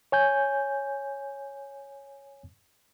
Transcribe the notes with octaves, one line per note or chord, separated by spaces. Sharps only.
C#5 G#5 G6